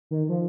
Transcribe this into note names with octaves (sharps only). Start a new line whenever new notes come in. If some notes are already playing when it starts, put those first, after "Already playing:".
D#3
F3